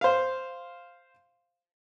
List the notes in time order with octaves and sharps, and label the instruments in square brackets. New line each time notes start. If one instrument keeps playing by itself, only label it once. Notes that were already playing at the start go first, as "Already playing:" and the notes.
[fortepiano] C5 F5